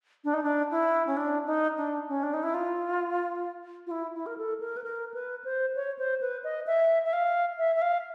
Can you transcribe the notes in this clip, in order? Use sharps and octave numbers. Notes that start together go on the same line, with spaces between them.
D4
D#4
D4
E4
C#4
D4
D#4
D4
C#4
D4
D#4
E4
F4
F4
E4
E4
A#4
A4
A#4
B4
A#4
B4
C5
C#5
C5
B4
D#5
E5
E5
F5
E5
E5
F5